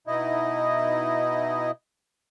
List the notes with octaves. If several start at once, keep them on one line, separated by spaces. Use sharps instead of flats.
B2 D#4 E4 D#5